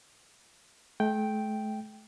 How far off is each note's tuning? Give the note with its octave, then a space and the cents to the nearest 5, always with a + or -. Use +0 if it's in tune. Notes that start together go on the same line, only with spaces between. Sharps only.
A3 -40 G5 +0